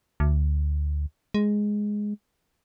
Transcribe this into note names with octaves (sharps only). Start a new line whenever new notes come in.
D2
G#3